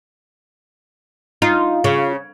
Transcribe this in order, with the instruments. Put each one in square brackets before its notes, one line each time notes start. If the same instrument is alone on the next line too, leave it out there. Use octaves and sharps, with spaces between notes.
[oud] D#4 [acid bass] F4
[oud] C#3